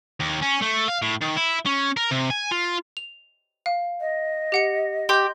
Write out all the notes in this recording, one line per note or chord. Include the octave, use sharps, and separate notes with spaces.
D#2
C#4
A3
F5
A2
D#3
E4
C#4
A#4
C3
G#5
F4
F7
F5
D#5
G4 F#5 C#7
G4 C6 G6